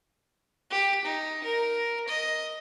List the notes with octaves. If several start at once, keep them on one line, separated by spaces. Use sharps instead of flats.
G4
D#4
A#4
D#5